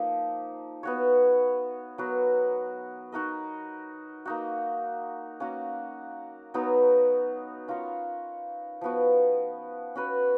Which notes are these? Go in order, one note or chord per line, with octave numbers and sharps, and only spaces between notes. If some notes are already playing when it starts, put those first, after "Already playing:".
Already playing: F3 A#3 D#4
B3 F#4 C#5
F#3 B3 F#4 A#4
D#4 F#4 A#4 D#5
A#3 D#4 F#4
A#3 C#4 F#4 A#4
F#3 B3 D#4 F#4
C#4 F4 A#4 C#5
F3 B3 F#4
C#4 F#4 B4